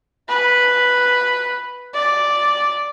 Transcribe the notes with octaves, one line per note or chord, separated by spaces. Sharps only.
B4
D5